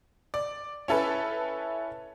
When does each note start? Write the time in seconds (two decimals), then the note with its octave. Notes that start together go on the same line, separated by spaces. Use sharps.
0.34 D5
0.88 C#4 E4 A4 B4